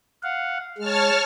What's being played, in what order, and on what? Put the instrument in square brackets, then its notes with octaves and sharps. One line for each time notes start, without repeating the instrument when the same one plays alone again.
[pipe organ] F5 F#5
[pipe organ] G#3 [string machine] C#5 A5 F6